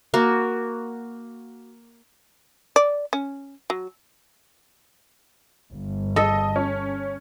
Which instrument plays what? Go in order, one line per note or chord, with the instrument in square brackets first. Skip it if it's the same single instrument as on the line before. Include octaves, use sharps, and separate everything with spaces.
[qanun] A#3 F#4
[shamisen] D5
C#4
F#3
[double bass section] G1
[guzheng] A4 [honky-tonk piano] D#5
[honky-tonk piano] C#4